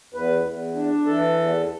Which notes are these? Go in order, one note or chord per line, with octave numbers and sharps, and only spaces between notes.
E2 B4
E2
D4
E3 A4
E2